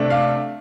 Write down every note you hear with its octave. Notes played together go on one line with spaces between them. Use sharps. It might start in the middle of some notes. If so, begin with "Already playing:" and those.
Already playing: C3 A3 D4
F5